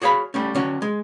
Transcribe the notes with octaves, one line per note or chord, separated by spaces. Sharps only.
F#4 G#4 C#5 F5 B5
G3 A3 C#4
D3 C#4 F#4
G#3